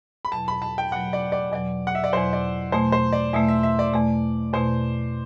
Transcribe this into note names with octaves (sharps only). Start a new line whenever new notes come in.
B5
E2 B2 F#3 A5
B5
A5
G5
E2 B2 F#3 F#5
D5
D5
E2 B2 F#3 D5
F#5
E5
D5
E2 B2 F#3 C5
D5
E2 B2 A3 C5
C5
D5
E2 B2 A3 E5
E5
E5
D5
E2 B2 A3
E2 B2 A3 C5